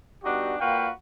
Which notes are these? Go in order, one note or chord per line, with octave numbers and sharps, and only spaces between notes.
G3 B3 D4 D#4 F#4 G4
A#2 A#3 F#4 B4 F5 G5